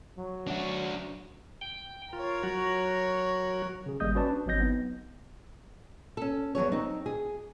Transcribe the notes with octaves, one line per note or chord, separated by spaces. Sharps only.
F#3
D4 F#4
G5
F4 A#4 C#5
F#3 F#4
C#3 G#4
G#1 G3 A#3 D#5 D#6 G6
C#4 F#4 B4 D5 A5
D4
G#1 F#3 C4 D#5 G6 A#6
B3 D#4
C#4 A4
E2 F#3 G#4 C#5
C4 D#4
G#4